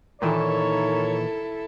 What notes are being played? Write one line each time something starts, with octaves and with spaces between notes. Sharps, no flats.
A#2 D#3 E3 E4 A4 A#4 C#5